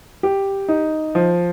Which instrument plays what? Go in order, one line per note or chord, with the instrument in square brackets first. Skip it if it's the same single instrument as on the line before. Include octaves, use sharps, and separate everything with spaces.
[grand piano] G4
D#4
F3